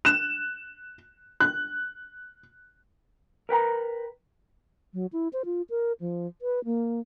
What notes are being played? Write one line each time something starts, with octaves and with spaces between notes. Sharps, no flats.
F#6 E7
F#6
A#4 B4 G5 A#5
F#3
E4
C5
F4
A#4
F3
B4
A#3